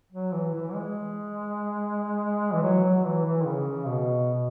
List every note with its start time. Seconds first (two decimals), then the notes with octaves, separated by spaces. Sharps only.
0.12 F#3
0.32 E3
0.54 E3
0.74 G#3
2.53 E3
2.63 F#3
2.84 F#3
3.05 E3
3.26 E3
3.42 D#3
3.46 C#3
3.88 B2